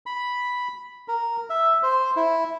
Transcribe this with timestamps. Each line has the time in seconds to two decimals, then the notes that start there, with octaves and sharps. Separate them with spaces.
0.06 B5
1.08 A#4
1.50 E5
1.83 C5
2.16 E4